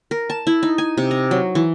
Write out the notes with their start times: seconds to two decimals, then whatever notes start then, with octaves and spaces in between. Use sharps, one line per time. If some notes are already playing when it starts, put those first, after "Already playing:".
0.11 A#4
0.30 A5
0.47 E4
0.63 D#4
0.78 G#5
0.97 C3
1.11 A#5
1.31 F#3
1.55 E3